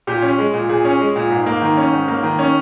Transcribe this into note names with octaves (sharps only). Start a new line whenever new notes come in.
A#2 G4
C#4
G#3
A#2
A#2 G#4
C#4
G#3
A#2
G#2
A#3
D#3
C#4
G#2
A#3
D#3
C#4